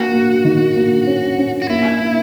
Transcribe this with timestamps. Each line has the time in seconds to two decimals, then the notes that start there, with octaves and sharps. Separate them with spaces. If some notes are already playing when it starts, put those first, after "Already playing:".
Already playing: A#3 F#4
0.13 A#3
0.45 D#3
0.75 A#3
1.07 C#4
1.38 C#4
1.62 F#4
1.69 A#3 E4
2.00 A#3